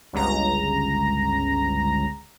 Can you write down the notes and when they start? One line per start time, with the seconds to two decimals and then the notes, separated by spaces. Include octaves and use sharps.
0.13 G1 C#2 A#5